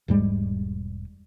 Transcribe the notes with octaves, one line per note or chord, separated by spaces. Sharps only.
E1 G#2 G3 G#3